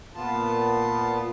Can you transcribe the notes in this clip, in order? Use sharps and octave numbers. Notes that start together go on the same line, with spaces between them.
A#2 B3 F4 A5